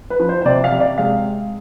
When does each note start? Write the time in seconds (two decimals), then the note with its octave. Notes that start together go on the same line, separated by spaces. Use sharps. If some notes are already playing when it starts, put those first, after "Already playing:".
0.10 B4
0.19 F3
0.29 C5
0.42 C5
0.45 C3 D5
0.64 F5
0.72 C3
0.80 D5
0.98 G#3 F5